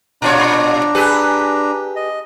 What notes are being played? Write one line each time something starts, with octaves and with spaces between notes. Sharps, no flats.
A#2 D4 F4 C#5 A#5
G4 G#4 B4
D#5